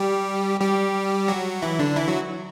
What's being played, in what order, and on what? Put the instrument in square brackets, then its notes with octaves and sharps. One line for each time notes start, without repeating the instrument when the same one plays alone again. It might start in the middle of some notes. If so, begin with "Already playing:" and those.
Already playing: [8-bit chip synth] G3 G4
G3 G4
F#3 F#4
E3 E4
D3 D4
E3 E4
F#3 F#4